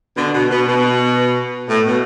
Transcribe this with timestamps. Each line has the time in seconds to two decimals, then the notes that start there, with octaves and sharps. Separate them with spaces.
0.17 B2 D3
0.34 B2
0.51 B2
0.67 B2
1.69 A2
1.86 B2